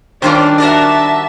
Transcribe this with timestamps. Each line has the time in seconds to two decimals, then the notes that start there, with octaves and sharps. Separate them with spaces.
0.22 D#3 G3 C#4 D4 F4 C5 D5
0.58 F#4 A#4 D5 E5 A5